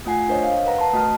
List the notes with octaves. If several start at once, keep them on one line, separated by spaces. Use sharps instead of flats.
A3 F4 F#5 G#5 C7
D4 A#4 C5 C#5 D#5
F5
A#4 B4 F#5 A#5
A5 C6
A3 F#4 D#5 A5 F6